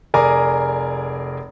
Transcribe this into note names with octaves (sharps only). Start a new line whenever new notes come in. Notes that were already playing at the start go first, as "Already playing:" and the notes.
F1 G#4 A#4 D5 G#5 A#5